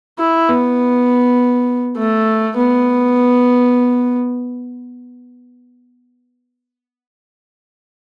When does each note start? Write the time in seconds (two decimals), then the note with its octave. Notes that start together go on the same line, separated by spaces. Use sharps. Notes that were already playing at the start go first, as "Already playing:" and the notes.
0.19 E4
0.49 B3
1.97 A3
2.57 B3